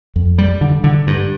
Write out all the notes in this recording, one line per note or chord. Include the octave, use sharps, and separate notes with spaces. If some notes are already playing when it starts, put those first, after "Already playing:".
F2
G3
D3
D3
G2